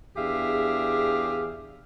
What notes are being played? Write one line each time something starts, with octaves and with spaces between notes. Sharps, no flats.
E2 D4 G4 G#4 E5 F5